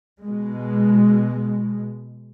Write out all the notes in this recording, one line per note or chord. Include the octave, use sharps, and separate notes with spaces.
B2 G#3